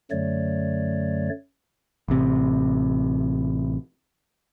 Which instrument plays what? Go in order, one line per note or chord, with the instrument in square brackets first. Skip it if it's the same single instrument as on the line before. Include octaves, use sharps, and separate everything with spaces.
[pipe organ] F#2 D3 F#3 A3 C#5 D5
[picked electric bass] A1 C3